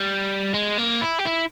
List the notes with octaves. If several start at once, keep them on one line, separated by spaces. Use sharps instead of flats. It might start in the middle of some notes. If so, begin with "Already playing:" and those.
Already playing: G3
G#3
A#3
E4
G4
E4